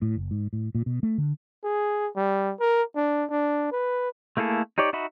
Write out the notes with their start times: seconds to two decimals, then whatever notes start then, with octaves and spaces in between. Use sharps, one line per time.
0.02 A2
0.16 F#1
0.31 G#2
0.53 A2
0.75 A#2
0.86 B2
1.03 A3
1.18 D3
1.64 G#4
2.16 G3
2.60 A#4
2.95 D4
3.30 D4
3.72 B4
4.37 A3 A#3 E4 G#4 A4
4.78 D#4 G4 C#5 D5
4.93 D#4 F#4 E5 B5